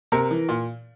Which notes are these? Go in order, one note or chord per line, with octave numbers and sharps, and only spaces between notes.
C3 A#4
E3
A#2